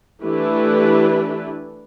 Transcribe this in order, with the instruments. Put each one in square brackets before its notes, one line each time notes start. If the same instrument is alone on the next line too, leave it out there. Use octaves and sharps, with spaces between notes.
[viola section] E3 A3 D4 E4 G4 B4